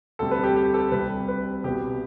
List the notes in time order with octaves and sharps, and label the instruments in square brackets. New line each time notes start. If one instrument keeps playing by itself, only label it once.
[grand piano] D2 C3 G3 A4
B4
G4
G4
A4
C2 C3 G3 B4
B4
C2 B2 B3 G4